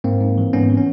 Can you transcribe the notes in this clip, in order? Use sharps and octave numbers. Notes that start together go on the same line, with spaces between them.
G#2 A#3 C4
G#2
E3
G#2 B3 C#4
E3
C#4